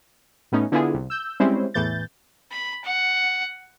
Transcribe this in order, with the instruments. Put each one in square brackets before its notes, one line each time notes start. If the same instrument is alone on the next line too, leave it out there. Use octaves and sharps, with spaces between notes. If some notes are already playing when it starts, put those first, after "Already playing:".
[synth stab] A2 A3 B3 C#4 D#4
D3 B3 E4 F4 G#4
C2
E6 G6
G3 G#3 C4 C#4 E4 C5
E2 A2 E3 G6 A6
[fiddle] B5
F#5